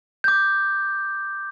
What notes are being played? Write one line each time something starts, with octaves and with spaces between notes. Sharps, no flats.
D6 G6